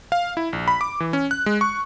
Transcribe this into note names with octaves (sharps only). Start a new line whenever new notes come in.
F5
E4
A#1
B5
D6
E3
C#4
F#6
G#3
C#6